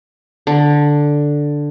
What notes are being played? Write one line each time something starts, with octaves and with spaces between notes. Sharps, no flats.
D3